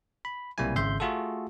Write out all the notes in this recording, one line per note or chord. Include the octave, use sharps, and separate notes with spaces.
B5
B1 C3 G3 A#3 E4 G#5
G#1 C#3 E5 C6 G6
A3 F4 F#4 G#4 A4